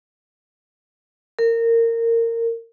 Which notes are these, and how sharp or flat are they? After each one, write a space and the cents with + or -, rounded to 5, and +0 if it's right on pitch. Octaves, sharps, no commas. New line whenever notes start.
A#4 -20